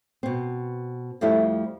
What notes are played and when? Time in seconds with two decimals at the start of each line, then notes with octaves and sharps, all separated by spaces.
0.23 B2 C4
1.21 F2 F3 G3 A3 E4